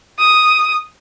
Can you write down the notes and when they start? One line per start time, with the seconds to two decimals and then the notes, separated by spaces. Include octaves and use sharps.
0.19 D#6